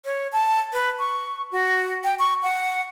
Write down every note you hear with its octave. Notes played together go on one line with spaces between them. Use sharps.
C#5
A5
B4
C#6
F#4
G5
C#6
F#5